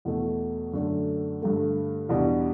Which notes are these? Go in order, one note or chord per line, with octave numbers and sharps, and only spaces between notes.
E2 B2 A3
F#2 D3 A3 D4
G2 D3 A3
E2 B2 G3 D4